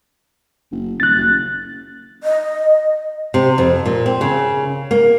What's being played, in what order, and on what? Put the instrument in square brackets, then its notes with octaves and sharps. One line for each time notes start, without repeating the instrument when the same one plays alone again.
[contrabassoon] F#1
[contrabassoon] D#1 [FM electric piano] F#6 A6
[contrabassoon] F#1
[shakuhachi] D#5
[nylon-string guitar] C3
F2
A#2
C4
C#3
A#3